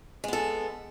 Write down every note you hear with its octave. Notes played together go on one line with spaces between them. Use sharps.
G#3 B3 A4